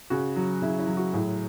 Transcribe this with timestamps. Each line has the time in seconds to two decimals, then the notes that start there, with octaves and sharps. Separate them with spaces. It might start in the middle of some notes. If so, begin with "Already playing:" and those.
0.10 C#3 F#4
0.36 F#3
0.62 C#3 E4
0.79 E4
0.87 F#3
0.97 F#4
1.13 A2 G#4